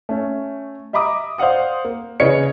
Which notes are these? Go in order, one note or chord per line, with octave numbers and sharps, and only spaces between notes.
A3 C#4
D#5 E5 A#5 B5 D6 D#6
C5 D5 F5 F#5 D#6
A#3
C#3 E3 B4 C#5 D#5 C#7